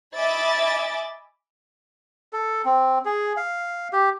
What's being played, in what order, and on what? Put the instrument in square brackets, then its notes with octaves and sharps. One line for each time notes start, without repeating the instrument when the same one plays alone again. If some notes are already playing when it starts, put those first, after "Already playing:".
[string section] D#5 E5 G#5 B5 D6 A6
[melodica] A4
C4
G#4
F5
G4